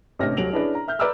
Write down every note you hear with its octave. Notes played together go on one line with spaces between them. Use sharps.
A1 C3 C#4 D4 F6 A#6
D#1 F#3 D7 F7 F#7
C#4 D4 E4 G#4 B4 D5
A#5
E5 F6 G6
B4 D5 A#5 D6 E6 F6